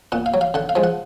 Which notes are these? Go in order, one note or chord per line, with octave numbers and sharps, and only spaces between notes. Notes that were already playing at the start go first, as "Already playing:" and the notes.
A#2 F#5
F5
F#3
F5
D3 F#5
F5
F3 G#3
F#5